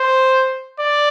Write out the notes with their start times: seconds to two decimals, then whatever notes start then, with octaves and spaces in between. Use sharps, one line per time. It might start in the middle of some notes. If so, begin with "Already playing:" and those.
Already playing: C5
0.79 D5